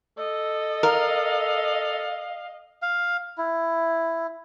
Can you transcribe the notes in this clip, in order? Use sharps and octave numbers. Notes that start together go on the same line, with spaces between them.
A4 D#5
A#4 F5
F5
E4